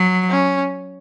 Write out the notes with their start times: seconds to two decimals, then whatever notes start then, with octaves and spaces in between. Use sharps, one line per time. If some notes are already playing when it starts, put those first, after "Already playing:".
Already playing: F#3
0.30 C#4